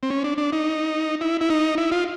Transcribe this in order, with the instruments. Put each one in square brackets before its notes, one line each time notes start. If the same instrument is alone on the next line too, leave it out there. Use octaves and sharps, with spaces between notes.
[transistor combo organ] C4
C#4
D4
D4
D#4
E4
E4
D#4
E4
F4